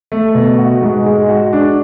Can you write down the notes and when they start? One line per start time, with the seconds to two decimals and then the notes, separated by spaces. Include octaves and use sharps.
0.12 A3
0.35 B2
0.58 F#4
0.82 G#2
1.06 G#3
1.29 F#4
1.53 D4